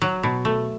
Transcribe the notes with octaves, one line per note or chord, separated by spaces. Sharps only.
F#3
B2
A3